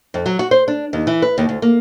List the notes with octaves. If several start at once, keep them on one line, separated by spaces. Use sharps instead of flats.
F2
F#3
F#4
C5
D4
D#2
E3
B4
D#2
D2
A#3